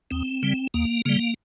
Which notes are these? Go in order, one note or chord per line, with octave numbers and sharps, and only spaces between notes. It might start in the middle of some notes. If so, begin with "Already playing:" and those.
D#2 C4
C#3 G3
D#2 A#3
C#3 G3 A#3